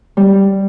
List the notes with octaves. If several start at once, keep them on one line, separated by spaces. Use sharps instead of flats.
G3